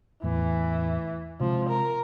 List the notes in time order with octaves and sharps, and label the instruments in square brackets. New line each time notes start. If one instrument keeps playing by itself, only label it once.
[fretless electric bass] E2 A2 [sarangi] E3
[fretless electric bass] C3 G#3 C4 [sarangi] F3
[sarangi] A#4